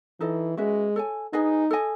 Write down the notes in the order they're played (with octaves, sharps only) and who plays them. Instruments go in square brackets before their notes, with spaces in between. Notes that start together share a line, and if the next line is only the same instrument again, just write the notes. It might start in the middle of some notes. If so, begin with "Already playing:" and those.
[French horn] E3 [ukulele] D#4 A4 D#5
[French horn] G#3 [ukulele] C#4 F#4 B4 E5
[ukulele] A4 C#5 G#5
[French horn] D#4 [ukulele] G#4 B4 D#5 G#5
[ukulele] A4 D#5 G#5